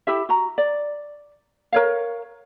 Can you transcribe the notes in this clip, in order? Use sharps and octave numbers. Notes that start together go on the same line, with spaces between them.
E4 G4 E5
F#4 A#5
D5
A#4 C#5 F5